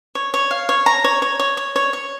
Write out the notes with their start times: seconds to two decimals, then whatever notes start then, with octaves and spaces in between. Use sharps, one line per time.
0.15 C#5
0.34 C#5
0.51 F5
0.69 C#5
0.86 A#5
1.04 C#5
1.22 C#5
1.40 C#5
1.57 C#5
1.76 C#5
1.93 C#5